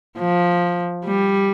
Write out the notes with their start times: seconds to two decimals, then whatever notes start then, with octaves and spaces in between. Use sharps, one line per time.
0.18 F3
1.05 G3